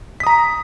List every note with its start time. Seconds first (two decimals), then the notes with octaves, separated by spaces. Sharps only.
0.20 B6
0.23 D#6
0.27 A#5